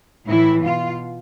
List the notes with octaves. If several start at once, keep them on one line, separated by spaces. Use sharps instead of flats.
A2 E3 E4
B2 F4